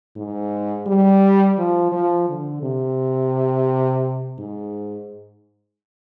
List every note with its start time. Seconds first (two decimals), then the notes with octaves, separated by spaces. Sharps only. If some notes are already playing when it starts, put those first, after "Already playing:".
0.16 G#2
0.87 G3
1.58 F3
1.92 F3
2.28 D3
2.63 C3
4.39 G#2